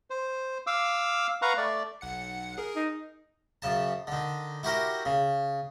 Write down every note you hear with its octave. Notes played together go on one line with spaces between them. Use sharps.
C5
F5 D6 E6
B4 F5 F#5 A#5 C#6
A3 D5
B1 F#5 C#7
G#4 A#4
D#4
F#2 C#3 A5
D3 D#3
E4 F#4 G4 A#4 G5
C#3